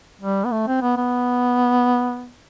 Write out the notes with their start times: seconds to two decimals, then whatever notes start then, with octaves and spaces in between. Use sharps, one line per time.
0.21 G3
0.45 B3
0.52 A3
0.67 C4
0.82 B3
0.97 B3